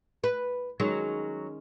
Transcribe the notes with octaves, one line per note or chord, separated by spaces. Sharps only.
B4
D#3 F#3 G#3 C#4